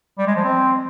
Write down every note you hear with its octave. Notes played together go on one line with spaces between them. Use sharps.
G3
G#3
F3
C4